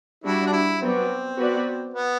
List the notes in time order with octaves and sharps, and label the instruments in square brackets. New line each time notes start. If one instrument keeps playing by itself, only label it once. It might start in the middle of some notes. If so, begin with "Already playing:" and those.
[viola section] G3 D4 F#4 [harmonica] E4
[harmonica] D4
E4
[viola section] F#3 B3 F#4 B4 D5 [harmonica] C4
[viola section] B3 F#4 B4 D5
[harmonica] B3